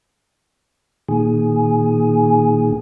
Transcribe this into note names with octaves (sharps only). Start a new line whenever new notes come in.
A#2 D#3 G#4